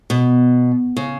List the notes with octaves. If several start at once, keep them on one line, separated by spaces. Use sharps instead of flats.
B2
C#3